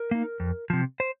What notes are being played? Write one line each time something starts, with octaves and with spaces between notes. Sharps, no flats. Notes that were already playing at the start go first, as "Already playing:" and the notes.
Already playing: A#4
A#3 D#4
F2
C3 F3
C5